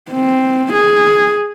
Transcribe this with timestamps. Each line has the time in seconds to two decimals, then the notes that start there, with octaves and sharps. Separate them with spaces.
0.12 C4
0.73 G#4